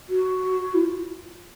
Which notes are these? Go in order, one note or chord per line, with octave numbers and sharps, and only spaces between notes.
F#4
E4
F4